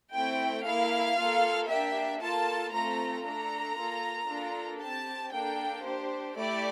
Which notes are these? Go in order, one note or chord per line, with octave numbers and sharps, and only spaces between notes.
A3 C4 E4 G5
A#3 E4 A4 F5
A#3 F4 A4
A#3 D4 G4 E5
A#3 F4 A4 A5
A3 C4 F4 A4 A#5
A3 D4 A4 A#5
A#3 F4 A4
A#3 D4 F4 A4
C4 G4 A5
A#3 D4 A4 G5
D4 G4 C5
A3 E4 G4 D5